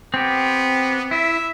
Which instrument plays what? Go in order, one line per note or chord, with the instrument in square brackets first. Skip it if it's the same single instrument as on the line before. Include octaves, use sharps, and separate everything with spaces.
[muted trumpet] B3 [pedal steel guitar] C4 G4
[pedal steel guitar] E4 [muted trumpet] E5